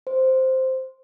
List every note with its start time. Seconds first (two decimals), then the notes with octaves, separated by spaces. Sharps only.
0.07 C5